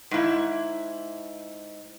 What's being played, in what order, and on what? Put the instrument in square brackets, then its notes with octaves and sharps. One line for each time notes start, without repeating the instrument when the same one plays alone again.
[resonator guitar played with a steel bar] G#2 E4